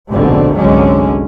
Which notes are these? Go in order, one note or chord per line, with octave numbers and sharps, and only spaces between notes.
F1 A#1 G#2 B2 D3 C4
G1 C2 D3 F#3 G#3 C#4